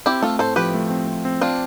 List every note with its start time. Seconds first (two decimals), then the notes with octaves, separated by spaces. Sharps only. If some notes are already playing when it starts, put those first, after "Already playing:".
0.06 C4 E4 G4
0.22 A3 F4 A4
0.39 A2 A4 C5
0.56 F3 G4 B4
0.74 A3
0.90 C4
1.07 C4
1.25 C4
1.41 C4 D4 F4